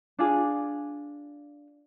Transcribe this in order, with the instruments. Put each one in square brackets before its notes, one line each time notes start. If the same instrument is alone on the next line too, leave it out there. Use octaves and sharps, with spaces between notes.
[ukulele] D4 F4 G#4